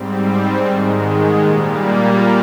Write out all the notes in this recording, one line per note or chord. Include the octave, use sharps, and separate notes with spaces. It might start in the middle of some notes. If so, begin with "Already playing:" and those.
Already playing: G#2 G3 C4
G#2 D#3 G#3
A#2 G3 A#3